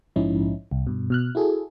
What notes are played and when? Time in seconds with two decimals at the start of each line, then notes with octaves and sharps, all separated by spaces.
0.16 A#1 G#2 F3 C#4 D#4 E4
0.71 C2
0.87 G2 B2
1.10 B2 F6 F#6
1.35 E4 F#4 G#4 A4